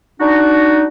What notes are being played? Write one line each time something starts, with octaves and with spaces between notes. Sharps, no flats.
D4 D#4 F#4